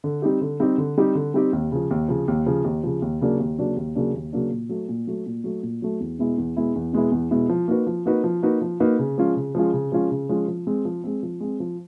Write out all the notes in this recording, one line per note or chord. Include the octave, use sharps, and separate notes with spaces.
D3
G3 C4 D#4 G4
D3
G3 C4 D#4 G4
D3
G3 C4 D#4 G4
D3
G3 C4 D#4 G4
D#2
C#3 F3
D#2
C#3 F3
D#2
C#3 F3
D#2
C#3 F3
D#2
C#3 F#3 A#3 D4
D#2
C#3 F#3 A#3 D4
D#2
C#3 F#3 A#3 D4
D#2
C#3 F#3 A#3 D4
A#2
F#3 A3
A#2
F#3 A3
A#2
F#3 A3
A#2
F#3 A3
E2
B2 G#3 B3 E4
E2
B2 G#3 B3 E4
E2
B2 G#3 B3 E4
E2
B2 G#3 B3 E4
F3
A#3 D#4 F#4 B4
F3
A#3 D#4 F#4 B4
F3
A#3 D#4 F#4 B4
F3
A#3 D#4 F#4 B4
C#3
F3 G#3 C#4 F4
C#3
F3 G#3 C#4 F4
C#3
F3 G#3 C#4 F4
C#3
F3 G#3 C#4 F4
F3
G#3 C4
F3
G#3 C4
F3
G#3 C4
F3